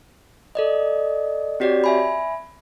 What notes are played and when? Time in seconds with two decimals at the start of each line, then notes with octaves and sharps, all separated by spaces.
0.55 A4 D5 D#5
1.60 C4 F#4 G4 C#5 D5
1.84 E5 G#5 B5